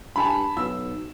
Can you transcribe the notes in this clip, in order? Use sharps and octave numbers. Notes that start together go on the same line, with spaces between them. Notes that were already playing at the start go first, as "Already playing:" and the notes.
G2 G#5 A5 B5
B1 E6